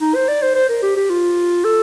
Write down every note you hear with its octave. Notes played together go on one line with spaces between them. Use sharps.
D#4
C5
D5
C5
C5
A#4
G4
G4
F4
A4